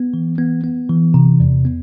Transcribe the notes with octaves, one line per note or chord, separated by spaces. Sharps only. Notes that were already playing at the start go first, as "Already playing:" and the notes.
Already playing: B3
E3
B3
B3
E3
C3
E2
B3